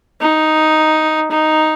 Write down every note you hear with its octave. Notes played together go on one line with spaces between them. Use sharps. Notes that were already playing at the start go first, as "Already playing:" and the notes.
D#4
D#4